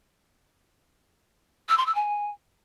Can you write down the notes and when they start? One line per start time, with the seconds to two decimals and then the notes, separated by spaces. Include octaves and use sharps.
1.69 E6
1.78 C6
1.86 E6
1.95 G#5